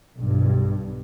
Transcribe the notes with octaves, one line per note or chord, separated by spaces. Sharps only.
B1 G2